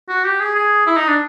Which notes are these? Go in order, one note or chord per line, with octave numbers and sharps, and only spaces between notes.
F#4
G4
G#4
G#4
E4
D#4
D4